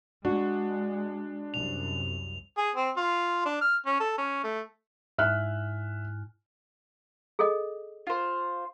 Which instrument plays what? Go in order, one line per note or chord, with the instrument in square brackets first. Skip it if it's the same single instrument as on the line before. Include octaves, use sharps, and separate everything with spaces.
[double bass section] G#3 [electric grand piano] D4 [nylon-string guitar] F#4
[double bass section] C2 F#2 [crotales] F7
[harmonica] G#4
C4
F4
D4
F6
C#4
A4
C#4
A3
[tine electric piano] G#2 E4 G#5 [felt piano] E5 F6 F#6
[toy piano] G#4 A4 D#5
[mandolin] F4 C5